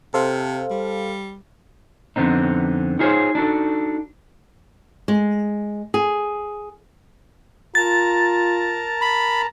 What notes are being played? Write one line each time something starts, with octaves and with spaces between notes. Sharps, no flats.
C3 A4 C5 F5
G3
F2 D3 B3 C4 D#4
D#4 F4 G#4 C5 C#5
D4 D#4 F#4 A4
G#3
G#4
F4 A#4 A5 A#5 A6
B5